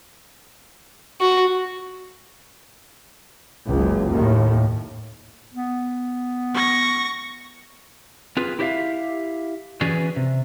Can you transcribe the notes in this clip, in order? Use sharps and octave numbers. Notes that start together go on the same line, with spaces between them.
F#4
F#1 C#2
D#2 A2
B3
C#6 A#6
C4 F4 G#4 B4
E4 G4 C5 D5 E5 F5
E3 C#4 F#4 G#4 B4 D5
C3